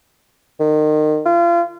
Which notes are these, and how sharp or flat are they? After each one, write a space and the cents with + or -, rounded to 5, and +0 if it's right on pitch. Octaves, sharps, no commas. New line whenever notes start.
D#3 -30
F4 -35